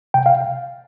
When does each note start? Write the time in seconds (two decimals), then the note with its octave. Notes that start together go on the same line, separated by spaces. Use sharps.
0.14 C3 G5
0.26 F5